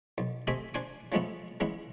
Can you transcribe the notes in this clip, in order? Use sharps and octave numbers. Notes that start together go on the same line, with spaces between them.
B1
A3 C4 G4 D#5 E5 G#5
D4 C5 G#5 D6
C#3 F3 G#3 A3 B3
C#3 E3 G#3 B3